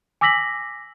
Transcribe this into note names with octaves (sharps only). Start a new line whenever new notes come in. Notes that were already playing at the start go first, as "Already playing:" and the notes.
G#5 D6 E6 A#6 B6 F#7